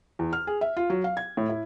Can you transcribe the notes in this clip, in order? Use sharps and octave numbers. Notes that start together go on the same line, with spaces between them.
E2
F6
G#4
E5
F4
F#3
F5
G#6
A2
E4